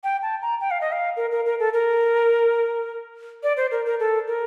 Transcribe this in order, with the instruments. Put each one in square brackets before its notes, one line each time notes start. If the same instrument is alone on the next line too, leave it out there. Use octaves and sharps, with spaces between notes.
[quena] G5
A5
A#5
G5
F5
D#5
F5
A#4
A#4
A#4
A4
A#4
D5
C5
A#4
A#4
A4
A#4